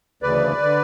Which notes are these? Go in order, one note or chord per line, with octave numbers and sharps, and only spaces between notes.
D2 C#3 E3 B4 D5
D3